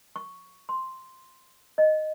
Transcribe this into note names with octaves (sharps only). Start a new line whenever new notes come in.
C#6
C6
D#5